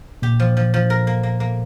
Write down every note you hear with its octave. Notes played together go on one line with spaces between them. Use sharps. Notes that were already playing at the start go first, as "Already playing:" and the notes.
A#2 G4
F3
F3
F3
A#4
A#3
A#3
A#3